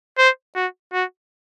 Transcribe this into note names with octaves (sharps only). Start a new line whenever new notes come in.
C5
F#4
F#4